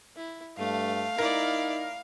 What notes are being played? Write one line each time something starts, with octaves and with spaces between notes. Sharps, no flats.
E4
G2 A3 F5
D#4 E4 A#4 D5